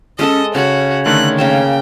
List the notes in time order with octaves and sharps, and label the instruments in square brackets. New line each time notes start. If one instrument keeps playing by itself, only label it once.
[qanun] G#3 A4 A5 [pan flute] C#4 [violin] D#5
[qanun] C#3 A5 [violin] F#4 [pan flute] C#5
[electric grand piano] D3 D#3 A3 [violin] F#6
[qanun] C#3 A#3 A5 [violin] G5